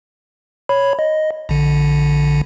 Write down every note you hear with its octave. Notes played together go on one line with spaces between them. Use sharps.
C#5 B5
D#5
A#1 D3